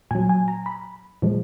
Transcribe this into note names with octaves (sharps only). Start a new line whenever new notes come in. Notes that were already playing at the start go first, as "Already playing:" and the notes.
A#2 F#3 G#5
G#5
A#5
B5
A#2 F3 G#3